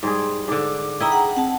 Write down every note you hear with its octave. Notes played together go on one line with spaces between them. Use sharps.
G#2 G3 G#4 C6
G#2 D3 D6
E4 D#5 E5 G5 A#5
G#4 F#5
C4 F#5 A5